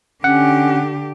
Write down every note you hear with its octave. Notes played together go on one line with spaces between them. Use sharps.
D3 C#4 G4 F#5